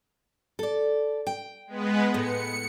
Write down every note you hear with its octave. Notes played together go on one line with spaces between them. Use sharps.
A4 D5
G5
G#3 B3 B4
A2 C#7